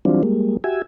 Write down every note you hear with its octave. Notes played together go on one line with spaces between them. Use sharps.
E3 F#3 G3 C4 D4 F4
G3 G#3 A#3
F#4 G4 E5 G#5